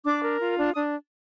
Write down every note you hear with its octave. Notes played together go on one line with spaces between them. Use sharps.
D4 D6
A#4
F4
D4
D4 D#6